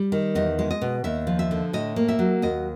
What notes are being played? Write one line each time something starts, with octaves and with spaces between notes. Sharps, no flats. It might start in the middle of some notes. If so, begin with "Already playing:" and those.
Already playing: G3
D#3
E2 D#5
G#3
D#5
B2
D#2 E5
F3
E5
D3
A2 D#5
A#3
E5
F#3
D#2 D#5